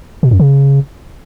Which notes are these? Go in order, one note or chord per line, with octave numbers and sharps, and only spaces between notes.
B2
F#2
C#3